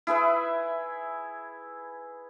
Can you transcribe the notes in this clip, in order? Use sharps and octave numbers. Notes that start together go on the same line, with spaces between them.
E4 G#4 B4 E5